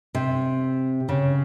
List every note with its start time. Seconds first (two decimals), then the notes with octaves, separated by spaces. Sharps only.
0.15 C3
1.09 C#3